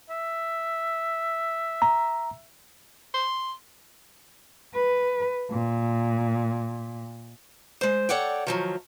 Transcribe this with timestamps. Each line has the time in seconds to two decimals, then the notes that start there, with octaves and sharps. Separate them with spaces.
0.10 E5
1.82 A#5
3.14 C6
4.74 B4
5.51 A#2
7.81 G#3 C5
8.09 A4 C#5 D5 F#5 G5
8.47 D#3 F3 F#3